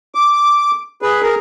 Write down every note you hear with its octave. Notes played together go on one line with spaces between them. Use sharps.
D6
G#4 B4
G#4 A#4